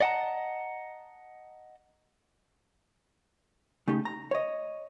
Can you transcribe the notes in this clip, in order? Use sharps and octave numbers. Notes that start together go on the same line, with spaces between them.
D5 D#5 F#5 G5 A5 A#5
C#3 A3 D#4 G4
A#5
C#5 D#5